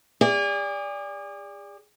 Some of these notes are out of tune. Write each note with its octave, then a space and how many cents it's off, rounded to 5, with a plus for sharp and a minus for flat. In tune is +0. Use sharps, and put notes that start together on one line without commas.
G#4 -40 D5 -10